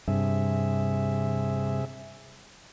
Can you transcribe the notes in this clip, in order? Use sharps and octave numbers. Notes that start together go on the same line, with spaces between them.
G2 C3 G#4 E5